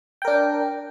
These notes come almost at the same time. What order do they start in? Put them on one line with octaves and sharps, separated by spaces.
G5 A#4 D4